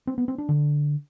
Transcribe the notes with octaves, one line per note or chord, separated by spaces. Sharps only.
C4
B3
C4
D4
D3